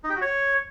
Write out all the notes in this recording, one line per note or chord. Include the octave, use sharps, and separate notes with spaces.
D#4
G4
F#4
C#5